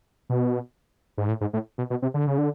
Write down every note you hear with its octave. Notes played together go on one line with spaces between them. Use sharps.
B2
G#2
A2
G#2
A2
B2
B2
C3
D3
C#3
D3